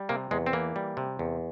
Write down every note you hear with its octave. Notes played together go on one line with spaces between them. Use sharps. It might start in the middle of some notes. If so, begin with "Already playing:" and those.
Already playing: G3
C3 A#3
E2 G#3
C4
E3 A#3
G3
C3
E2